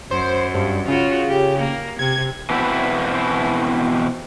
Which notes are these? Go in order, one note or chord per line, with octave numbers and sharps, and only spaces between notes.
F#2 C5
G2
C#3 F4 F#4
G4
A#3
C3 G#6
B2 E3 B3 C4 E4